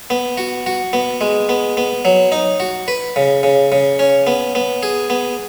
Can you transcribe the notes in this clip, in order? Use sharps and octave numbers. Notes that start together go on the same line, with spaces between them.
B3
F#4
F#4
B3
G#3
B3
B3
F#3
D#4
F#4
B4
C#3
C#3
C#3
C#4
B3
B3
G#4
B3